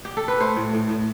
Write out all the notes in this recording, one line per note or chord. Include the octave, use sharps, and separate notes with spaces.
G4
A4
B4
A3 C5
A2
A2
A2